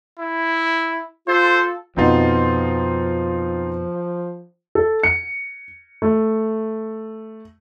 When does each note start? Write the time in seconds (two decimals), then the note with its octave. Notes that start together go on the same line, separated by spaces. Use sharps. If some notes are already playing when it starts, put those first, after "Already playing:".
0.20 E4
1.28 F4 A4 C5
1.97 F2 B2 F3 C4 D#4 F4
4.75 A4
5.03 C#7
6.02 A3